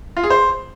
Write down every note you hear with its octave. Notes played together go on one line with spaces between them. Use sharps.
F4
G#4
C5